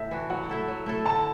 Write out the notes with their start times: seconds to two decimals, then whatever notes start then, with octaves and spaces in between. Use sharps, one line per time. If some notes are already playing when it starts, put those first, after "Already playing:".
Already playing: A2 E5
0.11 E3 D4 F#4
0.30 F#3 F#5
0.49 A3 E4 A4
0.68 F#3
0.86 A3 E4 A4
1.06 D3 A5